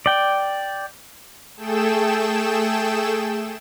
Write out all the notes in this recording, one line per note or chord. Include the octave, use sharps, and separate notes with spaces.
D5 G5
A3 G#4 A4 G5 E7